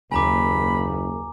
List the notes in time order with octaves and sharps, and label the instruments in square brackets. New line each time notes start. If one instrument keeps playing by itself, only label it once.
[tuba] F#1 [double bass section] D#2 [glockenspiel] G#5 A#5 D6 [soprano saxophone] B5